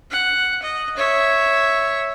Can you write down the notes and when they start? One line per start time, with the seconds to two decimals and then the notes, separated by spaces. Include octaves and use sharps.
0.11 F#5
0.62 D#5
0.97 C#5 E5